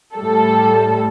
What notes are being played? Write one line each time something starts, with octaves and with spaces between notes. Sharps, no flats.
A2 G3 A4